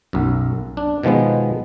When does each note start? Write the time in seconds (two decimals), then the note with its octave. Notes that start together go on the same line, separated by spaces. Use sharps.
0.13 B1 F#2
0.77 D4
1.03 B2 D#3 F3 G#3 B3